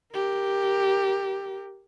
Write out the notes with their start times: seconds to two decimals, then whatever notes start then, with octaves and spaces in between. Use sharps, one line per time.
0.13 G4 A#4